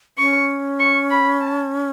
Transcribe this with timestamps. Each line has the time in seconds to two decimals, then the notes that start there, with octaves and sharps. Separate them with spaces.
0.18 C#4 C#6
0.79 C#6
1.10 B5
1.41 A5